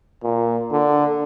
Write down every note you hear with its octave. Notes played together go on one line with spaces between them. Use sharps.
A#2
D3